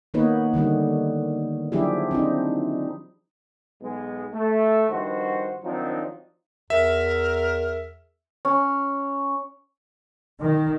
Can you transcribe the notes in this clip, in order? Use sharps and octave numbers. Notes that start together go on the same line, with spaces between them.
D#3 A#3 B3 D#4 B4 C#5
D3 D#3 G3 D#4
F3 F#3 D4 E4 G4 G#4
C4 D4 D#4
B1 G#3 B3
A3
G2 D#3 F3 F#4 C5
D#3 F3 F#3 C4 D4 D#4
E2 A#4 E5
C#4
D#3